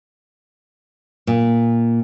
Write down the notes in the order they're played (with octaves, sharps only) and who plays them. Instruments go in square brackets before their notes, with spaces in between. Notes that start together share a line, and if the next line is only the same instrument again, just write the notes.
[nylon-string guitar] A#2